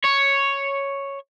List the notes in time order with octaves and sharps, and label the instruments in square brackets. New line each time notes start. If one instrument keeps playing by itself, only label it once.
[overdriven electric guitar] C#5